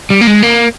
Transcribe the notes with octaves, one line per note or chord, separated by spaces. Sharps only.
G3
A#3
G#3
A#3